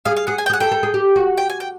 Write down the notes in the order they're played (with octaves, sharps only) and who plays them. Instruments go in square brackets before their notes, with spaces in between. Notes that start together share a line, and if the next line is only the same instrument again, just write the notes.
[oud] G#4 [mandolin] F5
[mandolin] F5
[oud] G#4 [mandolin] F#5
[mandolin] G#5
G5
[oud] G#4 [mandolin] F#5
[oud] A4 [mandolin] G5
[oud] A4
G#4
G4
F#4
[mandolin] G5
G#5
G5